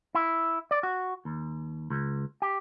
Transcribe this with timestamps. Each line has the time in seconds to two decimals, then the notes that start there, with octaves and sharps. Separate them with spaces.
0.15 E4
0.71 D5
0.83 F#4
1.25 D#2
1.90 C#2
2.42 G4